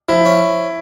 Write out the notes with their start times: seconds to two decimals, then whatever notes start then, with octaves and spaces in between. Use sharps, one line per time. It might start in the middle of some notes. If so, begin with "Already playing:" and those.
0.08 F3 E4
0.25 C#4